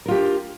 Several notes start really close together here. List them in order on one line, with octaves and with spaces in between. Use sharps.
A#4 F4 G4 D4